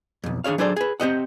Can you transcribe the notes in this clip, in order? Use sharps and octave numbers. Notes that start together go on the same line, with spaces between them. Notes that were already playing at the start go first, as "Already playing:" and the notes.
B1 F2
D#3 D4 G#4 C#5 F5
F#3 D4 G#4 A4 C5 D5
G#4 B4
C4 G4 D#5 F#5